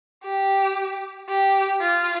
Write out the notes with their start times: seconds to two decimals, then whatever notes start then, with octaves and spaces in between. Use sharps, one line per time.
0.24 G4
1.29 G4
1.81 F4